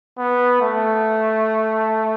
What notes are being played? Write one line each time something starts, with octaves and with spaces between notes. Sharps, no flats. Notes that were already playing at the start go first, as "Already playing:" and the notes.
B3
A3